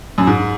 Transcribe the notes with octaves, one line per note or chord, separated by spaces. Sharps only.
F#2
G#2